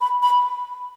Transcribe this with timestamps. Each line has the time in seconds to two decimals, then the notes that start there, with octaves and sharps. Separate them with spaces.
0.01 B5
0.23 B5